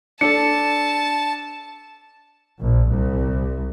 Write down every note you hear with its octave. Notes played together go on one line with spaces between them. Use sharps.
D4 A4 A5 C#7
A#1
C2